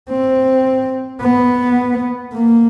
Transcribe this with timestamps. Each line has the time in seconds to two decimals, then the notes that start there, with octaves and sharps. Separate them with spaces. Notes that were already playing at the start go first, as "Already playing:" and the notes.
0.09 C4
1.21 B3
2.33 A#3